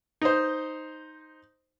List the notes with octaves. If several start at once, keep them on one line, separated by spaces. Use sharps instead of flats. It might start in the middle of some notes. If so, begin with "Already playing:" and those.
D#4 C5